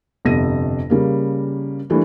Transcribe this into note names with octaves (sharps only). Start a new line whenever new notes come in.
G1 F2 C3 A#6 D#7
C#3 G3 A#3
E3 G3 A3 A#3 D4